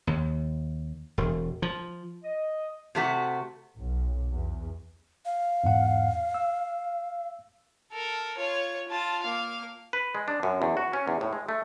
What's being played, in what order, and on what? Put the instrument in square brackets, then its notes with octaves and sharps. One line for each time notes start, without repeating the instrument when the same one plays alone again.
[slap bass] D#2
E1
F3
[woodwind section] D#5
[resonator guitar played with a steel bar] C3 A3 F#4
[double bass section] B1
E2
[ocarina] F5
[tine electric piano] E2 G#2 F#5
E6
[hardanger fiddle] A4 A#4
F4 C#5
F4 A5
A#3 F5
[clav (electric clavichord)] B4
G#3
D4
F#2
E2
F#4
C#4
E2
A2
G#3
A3